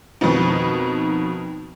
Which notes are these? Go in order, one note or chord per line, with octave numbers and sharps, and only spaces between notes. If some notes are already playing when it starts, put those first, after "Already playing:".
F2 B2 D#3 B3 D#4